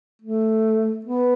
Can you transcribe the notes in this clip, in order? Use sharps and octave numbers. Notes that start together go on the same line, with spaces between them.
A3
B3